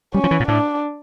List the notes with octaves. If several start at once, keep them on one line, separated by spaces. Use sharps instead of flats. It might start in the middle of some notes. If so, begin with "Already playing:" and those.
G3 C#4
F3
E3
A#2
A2 D4